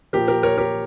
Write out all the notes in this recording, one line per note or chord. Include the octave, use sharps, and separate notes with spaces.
A#2 F3 G4 A#4
G4 A#4
A#4 C#5
G4 A#4